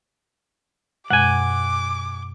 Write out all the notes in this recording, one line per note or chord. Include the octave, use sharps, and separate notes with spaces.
F#2 B2 G#3 F#5 G#5 D6